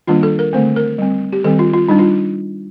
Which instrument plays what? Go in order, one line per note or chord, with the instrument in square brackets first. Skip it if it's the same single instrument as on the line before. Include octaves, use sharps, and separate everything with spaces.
[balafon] D#3 G3 A#3 D4 F4
A4
A#4
D3 A3 C4 C5
A#4
G3 C4
G4
D#3 G3 C4 A4
F4
F4
G3 D4 D#4
F4